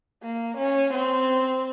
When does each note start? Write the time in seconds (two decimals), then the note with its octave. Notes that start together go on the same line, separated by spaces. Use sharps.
0.23 A#3
0.58 C#4
0.93 C4